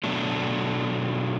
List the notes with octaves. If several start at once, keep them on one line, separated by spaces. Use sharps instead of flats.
B2 F#3 A3 D4